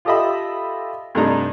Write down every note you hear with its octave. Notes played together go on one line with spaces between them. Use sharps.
F4 G4 A4 D#5 E5 B5
G2 C3 A3 D4 D#4 A#5